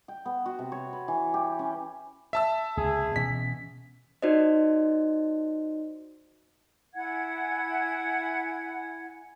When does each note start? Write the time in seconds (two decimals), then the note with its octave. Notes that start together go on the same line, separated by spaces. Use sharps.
0.08 G5
0.25 B3
0.46 F#4
0.59 C3
0.72 C#5
0.93 B4
1.08 E3
1.34 G4
1.59 C#4
2.33 E5 A5 E6
2.77 C#2 C3 G#4
3.16 B2 E3 C#4 B6
4.22 D#4 F#4 C5 D5 D#5
6.95 E4 F#5 G#5 G#6